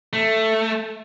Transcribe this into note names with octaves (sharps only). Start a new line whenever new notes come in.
A3